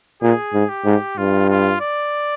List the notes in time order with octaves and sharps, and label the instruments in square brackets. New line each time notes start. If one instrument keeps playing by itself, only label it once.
[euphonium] A#2 [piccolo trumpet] G#4
[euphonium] G#2
[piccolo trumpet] G4
[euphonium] G#2
[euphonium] G2 [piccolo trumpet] F4
[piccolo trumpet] F4
D5